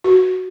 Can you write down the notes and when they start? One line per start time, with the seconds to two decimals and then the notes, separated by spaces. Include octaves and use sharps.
0.04 F#4